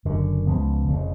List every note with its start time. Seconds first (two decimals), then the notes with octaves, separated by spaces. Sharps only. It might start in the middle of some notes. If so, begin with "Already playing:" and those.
0.05 F#1 F#2 D3
0.47 C#2 C#3 F3 B3
0.88 F1 F2 C#3